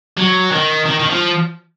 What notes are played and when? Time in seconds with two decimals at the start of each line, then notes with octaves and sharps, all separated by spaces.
0.17 F#3
0.51 D#3
0.86 D#3
0.99 D#3
1.09 F3